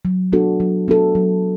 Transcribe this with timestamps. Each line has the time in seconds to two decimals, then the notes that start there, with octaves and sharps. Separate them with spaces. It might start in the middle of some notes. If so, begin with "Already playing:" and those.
0.05 F#3
0.32 B3 D4 F#4 A4
0.60 F#3
0.88 B3 D4 F#4 A4
1.15 F#3